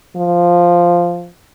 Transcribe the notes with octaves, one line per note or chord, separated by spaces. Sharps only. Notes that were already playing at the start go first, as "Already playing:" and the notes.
F3